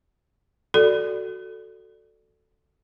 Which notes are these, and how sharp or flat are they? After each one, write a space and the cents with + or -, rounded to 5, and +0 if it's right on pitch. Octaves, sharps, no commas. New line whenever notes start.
F#4 +0 A4 +0 D5 +0